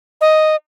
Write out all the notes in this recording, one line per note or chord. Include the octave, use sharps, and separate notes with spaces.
D#5